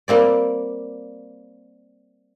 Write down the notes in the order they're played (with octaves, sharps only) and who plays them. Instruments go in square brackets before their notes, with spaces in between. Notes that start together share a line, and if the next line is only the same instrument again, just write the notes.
[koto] G3 A#3 C4 D5